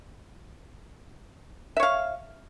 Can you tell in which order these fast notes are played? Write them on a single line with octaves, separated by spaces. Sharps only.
E5 C#5 F5